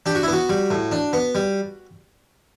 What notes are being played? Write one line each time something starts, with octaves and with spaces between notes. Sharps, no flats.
D4 G4
F#4
E4
B3 F#4
G3
A2
D4
B3
G3